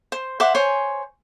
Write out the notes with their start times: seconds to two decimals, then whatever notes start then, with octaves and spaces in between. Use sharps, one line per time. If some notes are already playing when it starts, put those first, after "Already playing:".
0.12 C5
0.40 C5 E5 F#5 D6
0.55 C5 C#5 G#5